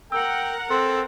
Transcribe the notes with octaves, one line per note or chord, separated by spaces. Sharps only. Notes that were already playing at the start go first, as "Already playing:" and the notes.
A#4 F#5 G5 E6
C4 A4 C6